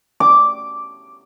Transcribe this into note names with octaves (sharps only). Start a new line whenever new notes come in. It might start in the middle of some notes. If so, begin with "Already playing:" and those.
D6